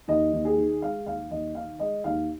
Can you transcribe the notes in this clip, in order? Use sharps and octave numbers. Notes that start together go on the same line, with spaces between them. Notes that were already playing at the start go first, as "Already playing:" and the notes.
D#2 D#5
D#2
G#4
D#3
G#3 F5
D#2 F5
D#2 D#5
D#3 F5
G#3 D#5
D#2 F5